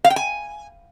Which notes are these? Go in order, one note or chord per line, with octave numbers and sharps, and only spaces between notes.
F5
G5
G#5